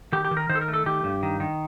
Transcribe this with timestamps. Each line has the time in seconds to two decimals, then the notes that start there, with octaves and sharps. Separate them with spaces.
0.12 D#3 G4
0.25 G4
0.31 D#3
0.37 A#4
0.49 D#3 C5
0.55 A4
0.61 A#4
0.68 A3
0.74 A4
0.86 D#3 G4
1.04 G2
1.23 D#3
1.40 D#3